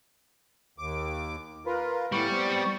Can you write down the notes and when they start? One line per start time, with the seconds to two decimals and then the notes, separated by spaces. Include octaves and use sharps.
0.78 D#2 D6
1.66 F4 A#4 B4
2.12 A2 E3 G3 B3 C#6
2.31 B3 C4